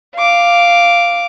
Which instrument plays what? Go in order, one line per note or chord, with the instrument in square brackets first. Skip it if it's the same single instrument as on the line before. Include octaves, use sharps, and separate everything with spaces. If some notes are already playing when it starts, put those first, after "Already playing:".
[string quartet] F5 D6